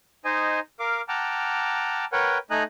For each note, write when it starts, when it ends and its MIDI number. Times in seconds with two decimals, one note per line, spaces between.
0.25 0.59 63
0.25 0.59 72
0.25 0.59 75
0.25 0.59 80
0.80 1.01 70
0.80 1.01 77
0.80 1.01 86
1.09 2.05 78
1.09 2.05 79
1.09 2.05 81
1.09 2.05 82
1.09 2.05 86
1.09 2.05 89
2.12 2.38 70
2.12 2.38 71
2.12 2.38 73
2.12 2.38 78
2.12 2.38 79
2.51 2.63 57
2.51 2.63 63
2.51 2.63 75
2.51 2.63 80
2.51 2.63 82
2.51 2.63 90